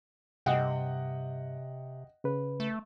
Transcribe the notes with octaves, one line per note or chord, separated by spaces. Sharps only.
G2 C3 D#5 F#5 G5
C#3 B4
A3